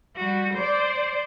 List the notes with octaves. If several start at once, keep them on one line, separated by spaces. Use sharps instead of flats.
G3 F#4
C5 D5